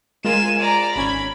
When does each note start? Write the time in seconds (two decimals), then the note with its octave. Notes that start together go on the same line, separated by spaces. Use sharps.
0.24 G#3 F4 A#4 G#5 E7
0.60 D5 A#5
0.96 G#1 C#4 B5 G#6